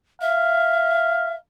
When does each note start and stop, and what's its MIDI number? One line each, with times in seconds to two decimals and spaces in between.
0.21 1.35 76
0.21 1.36 77